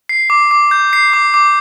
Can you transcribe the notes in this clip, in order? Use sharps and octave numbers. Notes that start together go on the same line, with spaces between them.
C7
D6
D6
G6
C7
D6
D6